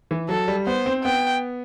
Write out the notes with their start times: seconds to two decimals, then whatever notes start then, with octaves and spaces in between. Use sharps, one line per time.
0.11 E3
0.29 F#3 A4
0.48 G3
0.66 B3 C5
0.86 C4
1.04 B3 G5